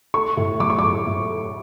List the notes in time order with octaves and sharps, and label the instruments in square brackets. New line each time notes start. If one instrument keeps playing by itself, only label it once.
[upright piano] A3 C#6
A2
F#3 D6
C#6
A2 D6
A2
A3